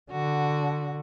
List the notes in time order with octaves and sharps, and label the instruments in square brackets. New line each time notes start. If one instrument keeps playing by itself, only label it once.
[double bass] D3 [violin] F#4